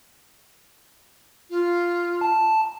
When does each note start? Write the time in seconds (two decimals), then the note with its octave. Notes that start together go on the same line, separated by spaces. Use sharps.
1.50 F4
2.21 A5